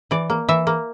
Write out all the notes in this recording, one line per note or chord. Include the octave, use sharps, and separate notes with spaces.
E3 D5
A#3
E3 E5
A#3